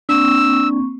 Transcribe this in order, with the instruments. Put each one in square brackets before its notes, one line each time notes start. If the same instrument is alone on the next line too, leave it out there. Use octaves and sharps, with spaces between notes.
[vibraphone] A#3 C4 C#6 [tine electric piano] D4 [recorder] E6